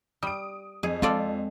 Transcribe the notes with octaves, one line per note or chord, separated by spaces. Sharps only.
G3 D#6 D7
F2 G#4
G#3 C4 F4 A4 D5